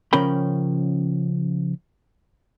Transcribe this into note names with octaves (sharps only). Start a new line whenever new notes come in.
C#3 F3 C#4 A#4 G5 B5